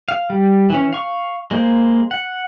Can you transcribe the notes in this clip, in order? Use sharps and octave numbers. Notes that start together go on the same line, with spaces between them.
F5
G3
E3 C#4
F5 C#6
G#3 A#3 C5
F#5